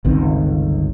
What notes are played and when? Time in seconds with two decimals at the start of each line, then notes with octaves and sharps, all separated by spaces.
0.05 G1 C#2 D#3 C4